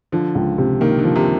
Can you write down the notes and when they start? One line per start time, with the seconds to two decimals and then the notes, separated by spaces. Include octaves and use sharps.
0.12 D3 F3
0.35 C#2
0.58 C3
0.81 D#3 A#3
0.98 D3
1.04 F3
1.16 C3